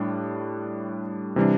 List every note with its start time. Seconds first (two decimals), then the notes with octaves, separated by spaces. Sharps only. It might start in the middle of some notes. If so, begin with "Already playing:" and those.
Already playing: A2 G3 D4
1.36 C3 E3 G3 D4